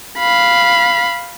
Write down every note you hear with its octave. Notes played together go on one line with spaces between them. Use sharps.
F5 B5